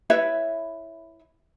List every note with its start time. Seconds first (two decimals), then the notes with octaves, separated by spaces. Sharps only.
0.10 E4 B4 C#5 E5